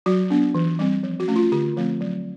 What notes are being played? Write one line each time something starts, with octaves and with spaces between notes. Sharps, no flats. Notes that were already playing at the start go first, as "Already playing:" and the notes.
F#3 F#4
B3 D4
E3
G3 C4
F3
F#4
A3 C#4
F4
D3 G4
F3 A3 C4
F#3